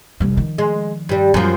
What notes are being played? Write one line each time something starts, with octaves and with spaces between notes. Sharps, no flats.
F1 G3
D#3 F3
G#3
G2 G3
F#2 F3 G3